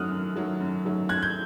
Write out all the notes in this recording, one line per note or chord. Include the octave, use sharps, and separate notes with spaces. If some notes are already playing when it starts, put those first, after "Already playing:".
Already playing: F#2 D#3 F#3 A3 D#6 F6 F#6
F#2
D#3 F#3 A3
F#2
D#3 F#3 A3
F#2 F#6 G#6
G6